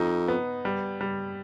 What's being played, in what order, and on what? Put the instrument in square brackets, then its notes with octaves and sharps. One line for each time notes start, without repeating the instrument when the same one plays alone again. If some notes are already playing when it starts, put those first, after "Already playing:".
Already playing: [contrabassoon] F2 [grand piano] D#4
[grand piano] B3
G3
G3